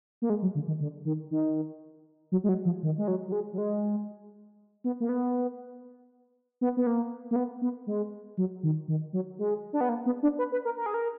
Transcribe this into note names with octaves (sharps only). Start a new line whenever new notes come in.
A#3
G#3
F#3
D3
D#3
D3
D#3
D#3
F#3
G#3
F#3
F3
D#3
G#3
F#3
F#3
G#3
F#3
G#3
B3
A#3
B3
B3
B3
A#3
A#3
B3
B3
G#3
F#3
D#3
D#3
F#3
G#3
D4
B3
A#3
B3
D4
B4
B4
A#4
A#4
G#4
A#4